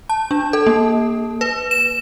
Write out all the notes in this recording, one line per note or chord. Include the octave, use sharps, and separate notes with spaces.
A5
D4
A4
A#3
B4
E7